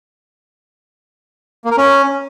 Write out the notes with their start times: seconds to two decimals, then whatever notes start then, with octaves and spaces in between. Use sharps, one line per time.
1.65 A#3
1.71 A#4
1.77 C#4